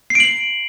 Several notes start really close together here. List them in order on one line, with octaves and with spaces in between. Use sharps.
C7 D7 F#7